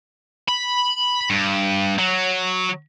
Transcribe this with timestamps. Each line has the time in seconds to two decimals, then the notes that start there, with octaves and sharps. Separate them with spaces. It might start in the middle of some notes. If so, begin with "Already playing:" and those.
0.48 B5
1.30 G2
1.98 F#3